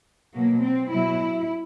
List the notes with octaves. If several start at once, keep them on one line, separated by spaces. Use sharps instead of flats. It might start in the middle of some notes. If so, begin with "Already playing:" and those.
B2 F#3 A#3
C4
B2 F#3 E4